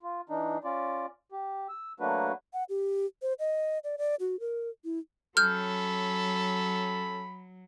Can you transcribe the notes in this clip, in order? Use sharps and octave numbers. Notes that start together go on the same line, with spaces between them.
F4
E3 D4 D#4
C#4 F4 D5
G4
E6
F#3 A3 A#3 D4 F#4 B4
F#5
G4
C5
D#5
D5
D5
F#4
A#4
E4
F#3 C#4 A4 B5 F6 G6